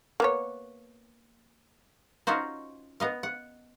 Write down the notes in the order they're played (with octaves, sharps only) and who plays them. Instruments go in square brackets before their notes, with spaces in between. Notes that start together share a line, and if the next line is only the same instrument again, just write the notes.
[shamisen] A#3 B3 C#5
[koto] C#4 D#4 F4 F#4 C5
B3 D#5 F5
F#5